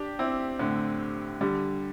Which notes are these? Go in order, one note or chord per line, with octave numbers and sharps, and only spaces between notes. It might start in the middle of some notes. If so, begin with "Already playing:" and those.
Already playing: D4 G4
C4 E4
A2 D3
D3 G3